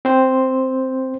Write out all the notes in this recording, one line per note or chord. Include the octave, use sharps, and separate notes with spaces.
C4 C5